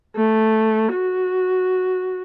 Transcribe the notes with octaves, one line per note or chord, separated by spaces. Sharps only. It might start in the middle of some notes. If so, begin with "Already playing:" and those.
A3
F#4